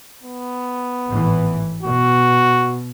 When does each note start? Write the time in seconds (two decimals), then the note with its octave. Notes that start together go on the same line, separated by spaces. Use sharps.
0.23 B3
1.06 G#1 A2 E3
1.83 B2 F#4